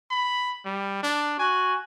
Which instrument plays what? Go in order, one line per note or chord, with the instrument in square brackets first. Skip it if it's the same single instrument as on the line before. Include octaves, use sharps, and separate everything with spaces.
[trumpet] B5
G3
D4
[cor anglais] F#4 [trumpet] G#5